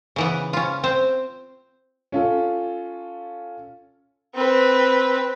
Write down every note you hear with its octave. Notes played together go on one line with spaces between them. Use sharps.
C#3 E3 B3
C#4 F4
C4 C5
C#4 F4 A4
C4 B4